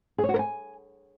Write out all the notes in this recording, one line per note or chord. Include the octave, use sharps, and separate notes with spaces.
G#4
C#5
F#4
A#4
G#5